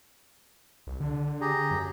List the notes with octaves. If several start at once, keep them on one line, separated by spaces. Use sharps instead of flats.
C2
D3
G4 G#4 A#5
F#2